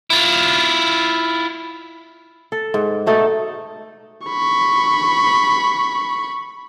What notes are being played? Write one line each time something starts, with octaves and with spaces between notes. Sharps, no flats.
E4 F4
A4
G#2
B2 A3 D#4 A4
B5 C#6